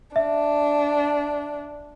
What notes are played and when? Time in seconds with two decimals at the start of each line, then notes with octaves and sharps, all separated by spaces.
0.16 D4 E5